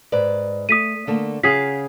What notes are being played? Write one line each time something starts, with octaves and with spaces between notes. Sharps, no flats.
G#2 B4 D5
A3 D#6 B6 D#7
D3 A3 A#3
C#3 G#4 F5 F#5 B6